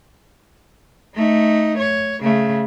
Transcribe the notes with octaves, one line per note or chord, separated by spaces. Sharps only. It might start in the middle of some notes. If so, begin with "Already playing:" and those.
A3 D#4
C#5
C#3 A3